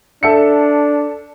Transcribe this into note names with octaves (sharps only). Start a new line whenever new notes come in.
D4 A4 E5 C#7